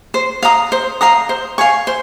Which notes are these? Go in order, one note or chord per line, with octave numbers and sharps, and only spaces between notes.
C5
F5 A#5 D#6
C5
F5 A#5 D#6
C5
F5 G#5 C#6
C5